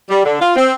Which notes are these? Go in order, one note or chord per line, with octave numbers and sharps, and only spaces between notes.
G3
D3
F4
C4